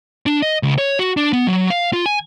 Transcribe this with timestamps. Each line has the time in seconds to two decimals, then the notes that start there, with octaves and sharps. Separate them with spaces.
0.26 D4
0.42 D#5
0.63 C#2
0.78 C#5
0.99 F#4
1.17 D4
1.33 B3
1.47 F#3
1.70 F5
1.93 F4
2.06 G#5